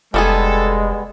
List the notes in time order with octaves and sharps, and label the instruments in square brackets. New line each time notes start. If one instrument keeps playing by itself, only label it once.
[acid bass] F1 [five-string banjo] G3 B3 G#4 [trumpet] G#3 [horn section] A4